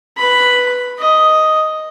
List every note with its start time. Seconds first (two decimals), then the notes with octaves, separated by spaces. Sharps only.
0.17 B4 B5
0.99 D#5